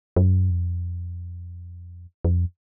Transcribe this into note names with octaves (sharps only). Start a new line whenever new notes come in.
F#2
F2
F2